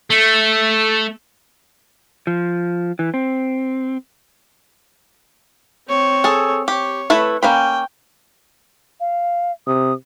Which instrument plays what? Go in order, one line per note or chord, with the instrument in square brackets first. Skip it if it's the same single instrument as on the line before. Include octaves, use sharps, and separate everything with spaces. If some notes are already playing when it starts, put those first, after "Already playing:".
[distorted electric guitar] A3
[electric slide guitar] F3
E3
C4
[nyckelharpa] C4 C#5
[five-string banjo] G#4 A4
[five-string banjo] G4 [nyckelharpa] C#5
[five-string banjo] A3 E4 B4
[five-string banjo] A#3 C#4 B5 [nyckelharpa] G5
[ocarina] F5
[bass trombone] C3 [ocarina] D#6